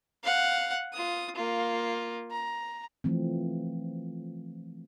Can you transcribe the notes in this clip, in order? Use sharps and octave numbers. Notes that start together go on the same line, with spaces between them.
F5 F#5
F4 D#6
A#3 F4
A#5
E3 F3 A3 C4